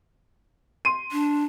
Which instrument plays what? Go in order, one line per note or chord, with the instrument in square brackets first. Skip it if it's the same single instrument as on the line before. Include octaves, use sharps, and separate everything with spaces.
[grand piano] C6 D#7
[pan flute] D4